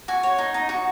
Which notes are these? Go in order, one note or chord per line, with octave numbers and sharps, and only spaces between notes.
F#4 G#5
C#5
D#4
D#4
F#4